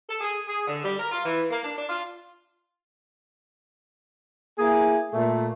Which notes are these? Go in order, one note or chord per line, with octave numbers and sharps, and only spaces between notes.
A4
G#4
G#4
D3
G3
A#4
F4
E3
A#3
D4
D4
F4
A#3 E4 G#4
A#2 A3